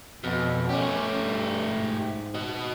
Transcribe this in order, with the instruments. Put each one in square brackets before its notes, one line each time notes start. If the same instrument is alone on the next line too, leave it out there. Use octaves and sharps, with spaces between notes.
[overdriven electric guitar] F2 [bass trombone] B2
[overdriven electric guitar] A3 G4 [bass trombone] C#4
[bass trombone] G2
G#2
[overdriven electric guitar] F#4 D#5